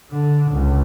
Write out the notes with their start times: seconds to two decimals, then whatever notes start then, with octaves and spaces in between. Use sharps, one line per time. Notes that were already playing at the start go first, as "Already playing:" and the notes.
0.11 D3
0.52 C#2